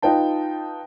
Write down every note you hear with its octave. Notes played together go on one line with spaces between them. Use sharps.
D#4 F4 B4 G5 A5